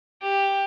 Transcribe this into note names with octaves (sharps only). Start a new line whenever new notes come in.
G4